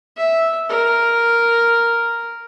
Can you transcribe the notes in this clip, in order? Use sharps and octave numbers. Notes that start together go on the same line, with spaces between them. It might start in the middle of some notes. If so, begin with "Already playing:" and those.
E5
A#4